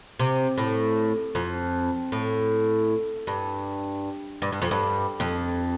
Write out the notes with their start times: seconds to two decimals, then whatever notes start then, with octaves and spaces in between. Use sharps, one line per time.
0.19 C3
0.58 A2
1.35 F2
2.12 A2
3.27 G2
4.42 G2
4.52 G2
4.62 F2
4.71 G2
5.20 F2